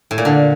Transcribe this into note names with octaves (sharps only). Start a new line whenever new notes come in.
A2
A#2
D3